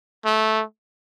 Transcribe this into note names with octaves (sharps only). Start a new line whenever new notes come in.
A3